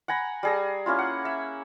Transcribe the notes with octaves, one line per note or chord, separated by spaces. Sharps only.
F#5 G#5 A#5 B5
G3 G#4 A#5
A#3 C#4 E4 F4
F#5
E5